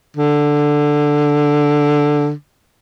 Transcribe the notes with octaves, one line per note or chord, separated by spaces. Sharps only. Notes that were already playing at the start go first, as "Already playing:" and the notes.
D3